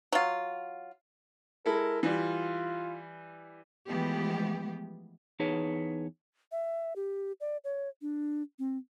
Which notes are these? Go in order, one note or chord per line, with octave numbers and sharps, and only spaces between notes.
F#3 F4
G#3 E4 A4 A#4
E3 G3 F4
E3 F3 G#3 A3 B3 G4
E2 D#4 G#4 B4 C#5 A5
E5
G4
D5
C#5
D4
C4